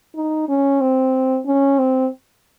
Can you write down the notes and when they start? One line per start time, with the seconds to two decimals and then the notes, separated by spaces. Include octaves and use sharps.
0.15 D#4
0.49 C#4
0.80 C4
1.46 C#4
1.79 C4